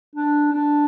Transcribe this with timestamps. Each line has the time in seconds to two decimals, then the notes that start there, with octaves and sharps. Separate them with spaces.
0.16 D4
0.52 D4